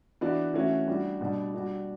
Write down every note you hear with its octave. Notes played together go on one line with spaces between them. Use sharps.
E3 B3 D4 F#4
E3 A3 C#4 F#4
G3 D4 F#4
B2 G3 D4
G3 D4 F#4